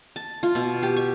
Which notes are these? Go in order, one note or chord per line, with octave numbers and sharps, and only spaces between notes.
A5
F4
B2
G4
C#6